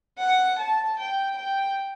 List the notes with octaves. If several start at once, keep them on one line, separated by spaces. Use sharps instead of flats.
F#5
A5
G5
G5